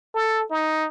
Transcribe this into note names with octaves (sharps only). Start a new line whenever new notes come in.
A4
D#4